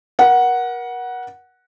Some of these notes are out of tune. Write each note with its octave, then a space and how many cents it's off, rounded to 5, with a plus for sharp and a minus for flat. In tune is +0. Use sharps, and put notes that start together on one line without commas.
A#4 +35 F#5 +0